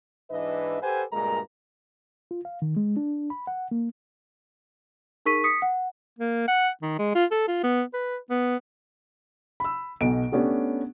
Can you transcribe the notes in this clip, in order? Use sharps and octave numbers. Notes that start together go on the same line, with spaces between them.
G#2 E3 D4 B4 D#5 E5
G4 A4 B4 C5 F#5 G#5
D2 G2 A#2 G#3 A#4 A#5
F4
F5
D#3
G#3
D4
B5
F#5
A#3
D#4 G#4 A#4 C#6 B6 D#7
D#6 B6 C#7
F#5
A#3
F#5
D#3
G#3
F4
A4
F4
B3
B4
B3
B5 E6
B1 B2 D7
A3 B3 C#4 D4 G4 C#5